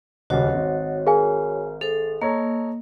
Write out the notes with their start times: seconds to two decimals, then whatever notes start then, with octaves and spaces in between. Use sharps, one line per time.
0.30 D#1 C#2 F#4 C5 C#5 D#5 F#5 A6
0.54 G#1
1.07 G#4 A#4 F5 G#5
1.81 G#4 A4 C5 F7
2.22 A#3 A4 C#5 D#5 A#5